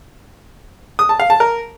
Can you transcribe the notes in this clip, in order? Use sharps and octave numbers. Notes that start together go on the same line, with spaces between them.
D#6
A5
F5
A5
A#4